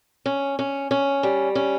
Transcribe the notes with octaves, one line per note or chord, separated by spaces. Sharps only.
C#4
C#4
C#4
G3
C#4